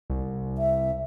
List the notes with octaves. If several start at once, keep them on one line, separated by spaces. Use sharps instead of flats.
C2
E5